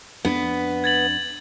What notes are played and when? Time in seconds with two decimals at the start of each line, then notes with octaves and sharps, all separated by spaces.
0.25 F2 B3 D4
0.84 G#6 A6 F#7